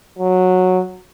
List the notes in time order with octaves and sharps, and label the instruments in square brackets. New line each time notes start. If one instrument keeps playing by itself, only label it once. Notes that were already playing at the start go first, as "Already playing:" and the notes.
[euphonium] F#3